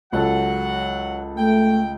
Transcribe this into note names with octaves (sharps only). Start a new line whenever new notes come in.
C#2 F#3 A4 F#5
A3 G5